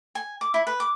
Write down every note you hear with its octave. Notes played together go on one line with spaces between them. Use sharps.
G#5
D6
E4
B4
D6